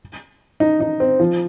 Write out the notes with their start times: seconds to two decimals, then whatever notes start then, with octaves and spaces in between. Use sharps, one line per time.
0.60 D#4
0.80 D#4
1.00 C4
1.20 F3